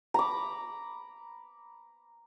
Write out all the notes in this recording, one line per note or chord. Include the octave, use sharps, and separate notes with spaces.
A#5 B5 D6